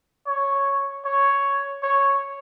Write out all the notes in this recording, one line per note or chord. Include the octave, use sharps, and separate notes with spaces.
C#5
C#5
C#5